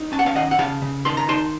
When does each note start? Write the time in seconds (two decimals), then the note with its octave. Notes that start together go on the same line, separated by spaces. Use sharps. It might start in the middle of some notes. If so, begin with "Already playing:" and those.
Already playing: D#4
0.12 C#4 A5
0.19 F#5
0.26 F5 A5
0.35 D#3 D#5 F#5
0.51 F#5
0.58 C#3 F5 A5
0.82 C#3
1.05 D#3 A5 C6
1.17 A#5
1.29 D#4 A5 C6